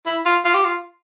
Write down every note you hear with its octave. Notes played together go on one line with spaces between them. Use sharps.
E4
F4
F4
G4
F4